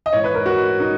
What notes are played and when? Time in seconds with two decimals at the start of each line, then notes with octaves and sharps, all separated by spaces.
0.06 D#5
0.13 G#2 E3 C#5
0.24 B4
0.34 A#4
0.46 F#4
0.80 D#4